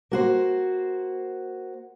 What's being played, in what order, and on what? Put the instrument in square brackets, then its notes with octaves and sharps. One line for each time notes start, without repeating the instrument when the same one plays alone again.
[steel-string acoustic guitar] A#3 F#4 C5